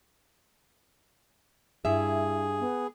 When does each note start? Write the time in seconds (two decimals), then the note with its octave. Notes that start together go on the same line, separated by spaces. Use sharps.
1.85 G2 E4 G#4 E5
2.59 B3